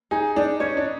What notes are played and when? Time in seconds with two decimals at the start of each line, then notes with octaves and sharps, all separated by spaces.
0.11 D#4 G#4
0.36 D4 D#4
0.60 C#4 C#5
0.77 D4